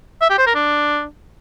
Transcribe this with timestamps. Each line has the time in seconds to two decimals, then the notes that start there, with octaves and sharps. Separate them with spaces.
0.21 E5
0.30 G4
0.38 C5
0.46 A#4
0.55 D4